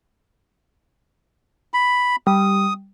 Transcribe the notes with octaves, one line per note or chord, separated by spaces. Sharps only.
B5
G3 D#6